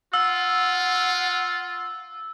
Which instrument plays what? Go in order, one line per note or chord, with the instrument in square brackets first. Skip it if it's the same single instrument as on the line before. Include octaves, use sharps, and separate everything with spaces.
[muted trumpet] F4 [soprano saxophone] F#5 [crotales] E6